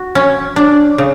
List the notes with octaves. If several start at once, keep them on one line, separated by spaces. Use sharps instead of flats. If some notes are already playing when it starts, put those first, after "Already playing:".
Already playing: F#4
C#4
D4
C#3